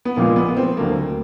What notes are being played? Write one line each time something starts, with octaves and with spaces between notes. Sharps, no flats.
B3
A#1 A#2 F3 G#3 A#3
B3
C4
D2 D3 F#3 A3 A#3